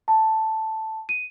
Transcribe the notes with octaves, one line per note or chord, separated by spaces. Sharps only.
A5
D#7